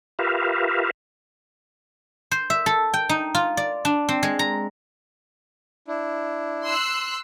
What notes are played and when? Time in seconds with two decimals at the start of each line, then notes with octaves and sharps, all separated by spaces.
0.19 F4 G4 A#4 B4 E5 F5
2.31 C5
2.50 E5
2.66 A4
2.94 G5
3.09 D#4
3.35 F4
3.57 D5
3.85 D4
4.09 C4
4.23 G#3
4.39 A#5
5.88 D4 E4
6.64 C6 E6 F#6